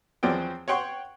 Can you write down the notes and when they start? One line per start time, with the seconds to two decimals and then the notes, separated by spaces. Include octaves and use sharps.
0.23 E2 F3 F#3 C4 D5 G5
0.68 C#5 F#5 G5 C6 C#6